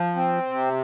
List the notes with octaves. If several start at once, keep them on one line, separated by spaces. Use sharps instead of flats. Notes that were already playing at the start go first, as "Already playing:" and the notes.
Already playing: F3
C4
C3